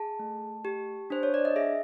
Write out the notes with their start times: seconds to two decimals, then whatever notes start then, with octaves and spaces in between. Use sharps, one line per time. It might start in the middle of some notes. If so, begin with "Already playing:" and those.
Already playing: G#4 A5
0.19 A3
0.65 G4
1.10 D4 C5
1.23 C#5
1.34 D5
1.45 D#5
1.56 G#4 E5